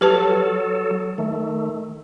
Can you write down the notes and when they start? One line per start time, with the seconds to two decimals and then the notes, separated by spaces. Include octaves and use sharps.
0.01 F#3 G4 A4 B4 A5
1.18 D#3 A3